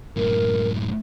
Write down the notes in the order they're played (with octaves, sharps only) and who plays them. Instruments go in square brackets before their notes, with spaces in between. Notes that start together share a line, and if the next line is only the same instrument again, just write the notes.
[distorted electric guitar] F#2 A2 [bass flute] A#4